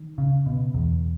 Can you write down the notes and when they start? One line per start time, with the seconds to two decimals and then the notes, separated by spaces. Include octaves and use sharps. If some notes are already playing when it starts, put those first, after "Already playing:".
Already playing: D#3
0.18 C#3
0.46 B2
0.74 E2